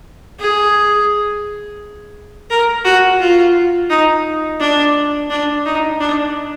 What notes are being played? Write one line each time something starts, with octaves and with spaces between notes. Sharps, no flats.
G#4
A#4
F#4
F4
D#4
D4
D4
D#4
D4